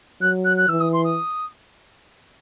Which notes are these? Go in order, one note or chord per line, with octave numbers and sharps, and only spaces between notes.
F#3 F#6
F#6
F#6
E3 E6
D#6
C6
D#6